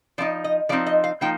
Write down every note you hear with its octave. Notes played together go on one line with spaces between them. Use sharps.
F3 C4 D#4 D5
D#5
F3 C4 D#4 D5
D#5
F5
F3 A#3 D#4 G5